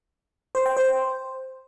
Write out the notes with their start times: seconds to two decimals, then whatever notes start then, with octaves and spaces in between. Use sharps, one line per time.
0.55 C5
0.66 G5
0.77 C5